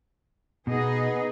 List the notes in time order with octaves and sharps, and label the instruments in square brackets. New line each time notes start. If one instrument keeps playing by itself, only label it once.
[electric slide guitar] B2 [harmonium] B3 [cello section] D#4 G#4 D#5